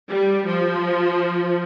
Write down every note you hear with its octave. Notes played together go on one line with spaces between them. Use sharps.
G3
F3